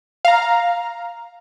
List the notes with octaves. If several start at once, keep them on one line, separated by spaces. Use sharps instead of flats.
F5 A#5